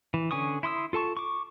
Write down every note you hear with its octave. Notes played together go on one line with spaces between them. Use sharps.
E3
D3 C#4 G#5 C#6 D#6
E4 C6 D#6 E6
F4 A4 A5 C#6
C#6 D6